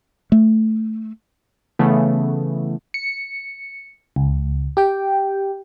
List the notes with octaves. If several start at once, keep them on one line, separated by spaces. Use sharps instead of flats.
A3
C#3 E3 A3 B3
C#7
C#2
G4 G5